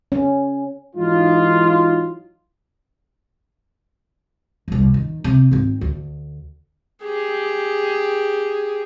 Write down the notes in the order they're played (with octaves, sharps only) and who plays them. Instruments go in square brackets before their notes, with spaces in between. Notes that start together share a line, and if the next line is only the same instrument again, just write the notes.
[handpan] C#4
[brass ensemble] G#2 E3 F#3 D#4 F4
[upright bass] E1 C2
D#3
C3
G#1 C4
D2
[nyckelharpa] G4 G#4